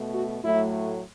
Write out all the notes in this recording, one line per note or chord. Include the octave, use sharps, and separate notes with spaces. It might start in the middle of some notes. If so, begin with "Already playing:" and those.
Already playing: B2 A3
F#4
A2 F#3 A3 E4